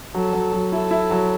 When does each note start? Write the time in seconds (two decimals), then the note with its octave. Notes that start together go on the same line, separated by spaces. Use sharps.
0.14 F#3 A4
0.33 F#3
0.53 F#3
0.72 E4 A4
0.91 E4
1.11 F#3